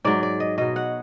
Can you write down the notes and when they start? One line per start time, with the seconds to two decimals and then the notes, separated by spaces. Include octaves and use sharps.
0.04 G#2 F#3 D5
0.23 D5
0.40 D#5
0.58 B2 F#3 D#5
0.76 F#5